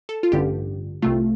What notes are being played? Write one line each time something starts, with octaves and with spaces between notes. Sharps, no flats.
A4
F4
A1 G2 D3 G4
C2 C3 A3 F4